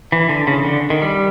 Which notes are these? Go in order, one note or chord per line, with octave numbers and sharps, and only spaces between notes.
E3
D3
C#3
D3
D#3
G3